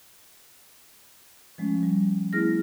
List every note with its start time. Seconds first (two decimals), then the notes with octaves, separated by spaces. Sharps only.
1.58 F3 G#3 A3 C#4
1.83 G3
2.33 A3 B3 E4 G#4 F6 A#6